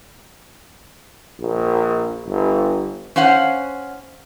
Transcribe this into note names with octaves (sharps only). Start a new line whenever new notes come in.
A#1
G1
C#4 C5 F5 F#5